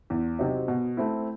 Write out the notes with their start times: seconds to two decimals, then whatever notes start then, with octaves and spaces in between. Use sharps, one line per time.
0.10 E2
0.39 C3 F#3 C4 D#4
0.68 B2
0.97 A3 C4 E4